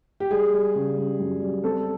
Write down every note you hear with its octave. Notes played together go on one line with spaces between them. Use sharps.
G4
G3 G#4
G3
C#3
G3
F#2
G3
C4 A4